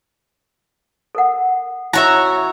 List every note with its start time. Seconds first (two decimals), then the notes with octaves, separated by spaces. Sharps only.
1.15 A4 A#4 F#5
1.93 E4 F#4 C#5 E5 A#5